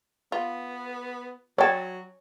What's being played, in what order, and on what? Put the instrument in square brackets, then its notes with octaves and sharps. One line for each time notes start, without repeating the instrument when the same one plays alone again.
[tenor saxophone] B3 [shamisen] F4
[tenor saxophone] F#3 [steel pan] C#5 A5 [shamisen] D5 G5